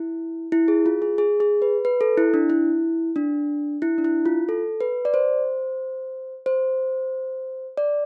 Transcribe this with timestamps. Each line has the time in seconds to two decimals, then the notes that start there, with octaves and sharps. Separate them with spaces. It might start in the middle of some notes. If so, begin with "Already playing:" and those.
Already playing: E4
0.52 E4
0.68 G#4
0.86 F4
1.02 G#4
1.18 G#4
1.40 G#4
1.62 B4
1.85 B4
2.01 A4
2.17 E4
2.34 D4
2.50 E4
3.16 D4
3.82 E4
3.98 D4
4.04 E4
4.26 F4
4.49 A4
4.81 B4
5.05 D5
5.14 C5
6.46 C5
7.77 D5